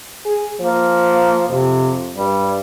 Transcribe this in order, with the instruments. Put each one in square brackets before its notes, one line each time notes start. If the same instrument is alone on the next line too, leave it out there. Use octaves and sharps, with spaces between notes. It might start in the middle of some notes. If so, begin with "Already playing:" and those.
[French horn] G#4
[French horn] F3 [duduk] A#3
[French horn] F2 [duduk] C3
[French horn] G2 [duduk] G3